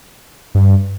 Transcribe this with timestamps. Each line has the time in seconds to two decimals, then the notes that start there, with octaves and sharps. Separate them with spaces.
0.55 G2